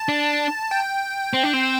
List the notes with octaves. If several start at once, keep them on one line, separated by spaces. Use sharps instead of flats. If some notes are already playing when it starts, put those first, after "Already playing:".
Already playing: A5
D4
G5
C4
D4
C4